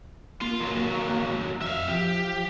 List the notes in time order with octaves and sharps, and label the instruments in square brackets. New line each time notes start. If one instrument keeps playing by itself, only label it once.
[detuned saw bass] A#3 [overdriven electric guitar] F4 C6
[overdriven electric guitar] D#2 F#3
[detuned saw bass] F2 [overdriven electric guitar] E5 F5
[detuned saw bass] F3 [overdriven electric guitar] G4